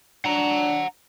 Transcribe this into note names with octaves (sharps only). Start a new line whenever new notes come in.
D4 F#5 A#5